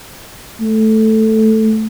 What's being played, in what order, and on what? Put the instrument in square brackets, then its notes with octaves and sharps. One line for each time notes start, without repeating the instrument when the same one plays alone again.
[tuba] A3